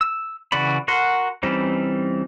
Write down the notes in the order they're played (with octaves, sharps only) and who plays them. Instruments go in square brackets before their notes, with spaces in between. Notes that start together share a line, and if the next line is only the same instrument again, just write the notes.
[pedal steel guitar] E6
C#3 E3 F#4 D5 B5
F#4 A#4 F#5 C6
E3 G3 C4 C#4 D#4